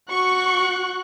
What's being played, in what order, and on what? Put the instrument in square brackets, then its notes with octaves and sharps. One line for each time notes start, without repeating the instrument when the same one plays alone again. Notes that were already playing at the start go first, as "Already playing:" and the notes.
[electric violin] F#4 F#6 [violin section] C#6